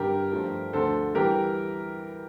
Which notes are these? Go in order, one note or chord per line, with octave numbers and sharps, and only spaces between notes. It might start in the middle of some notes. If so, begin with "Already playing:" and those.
Already playing: G2 D3 G3 G4 A#4
G2 F3 A3
D2 D3 F3 A3 A4 C5
E3 G3 G4 A#4